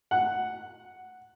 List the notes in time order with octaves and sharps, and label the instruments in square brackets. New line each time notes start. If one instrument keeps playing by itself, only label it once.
[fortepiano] F#5